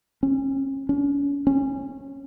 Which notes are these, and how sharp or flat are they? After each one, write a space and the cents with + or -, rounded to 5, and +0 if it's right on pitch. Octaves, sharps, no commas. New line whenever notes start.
C#4 -35
C#4 +35
C#4 -20